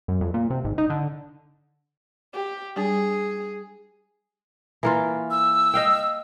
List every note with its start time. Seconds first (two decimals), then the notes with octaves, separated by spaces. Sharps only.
0.08 F#2
0.21 F2
0.34 A#2
0.50 C3
0.65 G#1
0.78 D#4
0.90 D3
2.33 G4
2.76 G3 D4 G#4
4.83 E3 A#3 F4
5.30 E6
5.74 D#5 F5 G5